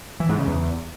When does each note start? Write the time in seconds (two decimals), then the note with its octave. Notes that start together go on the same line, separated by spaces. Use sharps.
0.20 E3
0.29 G#2
0.38 C#3
0.48 E2